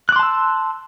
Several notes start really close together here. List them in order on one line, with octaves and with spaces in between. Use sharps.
F#6 D6 C6 A5 E6